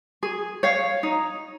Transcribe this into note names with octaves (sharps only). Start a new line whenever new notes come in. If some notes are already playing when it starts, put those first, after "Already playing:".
G#4
C#5 F5
D#4